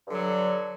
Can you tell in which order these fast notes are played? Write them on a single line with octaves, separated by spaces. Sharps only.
G2 D3 F#3